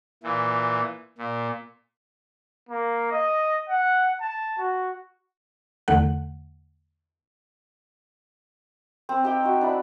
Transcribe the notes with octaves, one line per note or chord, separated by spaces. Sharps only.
A#2 E3
A#2
A#3
D#5
F#5
A5
F#4
E2 D3 A3 F#5
C4
D#4 G4 G5
D#4 F#4
D4 E4 B5